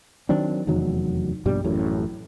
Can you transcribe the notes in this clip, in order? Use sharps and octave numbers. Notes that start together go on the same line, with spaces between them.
D#3 F#3 C4 D4
F1 E2 D#3 F#3
A#1 G2 B2 G3
A1 F#2 A2